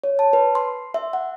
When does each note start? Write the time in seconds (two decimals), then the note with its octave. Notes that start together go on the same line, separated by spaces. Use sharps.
0.04 C#5
0.19 A5
0.33 B4
0.55 C6
0.94 E5
1.13 F#5